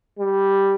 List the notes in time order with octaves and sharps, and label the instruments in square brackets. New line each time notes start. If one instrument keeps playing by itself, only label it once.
[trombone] G3